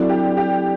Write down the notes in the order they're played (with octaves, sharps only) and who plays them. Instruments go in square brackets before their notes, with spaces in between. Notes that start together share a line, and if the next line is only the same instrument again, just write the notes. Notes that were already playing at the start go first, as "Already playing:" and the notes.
Already playing: [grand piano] F#3 C4 E4 A4 [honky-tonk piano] D4
[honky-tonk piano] G4
G4